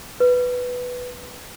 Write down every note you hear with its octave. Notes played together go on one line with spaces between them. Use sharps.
B4